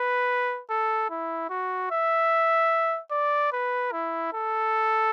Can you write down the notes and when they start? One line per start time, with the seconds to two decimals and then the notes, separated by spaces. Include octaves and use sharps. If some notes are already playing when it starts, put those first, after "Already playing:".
Already playing: B4
0.70 A4
1.10 E4
1.50 F#4
1.91 E5
3.11 D5
3.53 B4
3.92 E4
4.34 A4